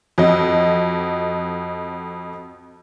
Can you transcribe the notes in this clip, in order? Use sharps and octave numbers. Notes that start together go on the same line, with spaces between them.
F2 F#4 D#5